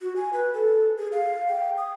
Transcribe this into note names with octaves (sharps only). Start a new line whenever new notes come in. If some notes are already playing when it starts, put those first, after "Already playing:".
F#4
G#5
B4
A4
G#4
F5
G5
D#6